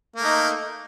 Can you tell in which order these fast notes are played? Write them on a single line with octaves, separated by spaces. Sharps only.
A#3 A3 D#4